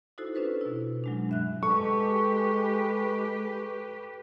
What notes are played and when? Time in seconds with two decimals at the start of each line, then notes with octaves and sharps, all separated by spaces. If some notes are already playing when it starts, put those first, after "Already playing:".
0.18 D#4 E4 F#4 A4 C5
0.35 C#4 D4 F4 A4 B4 C5
0.61 B2 E4
1.04 F#3 G#3 D4
1.29 G2 E5 F#6
1.63 G#3 G4 A4 B4 C#6